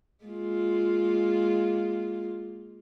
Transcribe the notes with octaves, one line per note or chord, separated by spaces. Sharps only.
G#3 A#3 F4